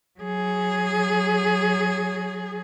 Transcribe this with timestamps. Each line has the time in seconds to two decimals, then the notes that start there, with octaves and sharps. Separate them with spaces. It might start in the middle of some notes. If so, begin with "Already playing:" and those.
0.20 F#3 G#4